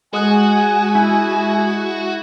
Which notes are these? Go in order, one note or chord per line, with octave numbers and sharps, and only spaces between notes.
G#3 F#4 G#5 D#6 F#6
E4